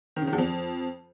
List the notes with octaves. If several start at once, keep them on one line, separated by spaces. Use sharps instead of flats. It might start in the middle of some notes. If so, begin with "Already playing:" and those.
D#3
C#3
D#3
E2
F2